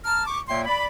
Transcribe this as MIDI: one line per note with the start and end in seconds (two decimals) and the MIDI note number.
0.05 0.24 81
0.05 0.24 82
0.05 0.24 89
0.28 0.40 85
0.28 0.40 86
0.49 0.65 46
0.49 0.65 58
0.49 0.65 73
0.49 0.65 76
0.49 0.65 79
0.49 0.65 84
0.67 0.87 74
0.67 0.87 83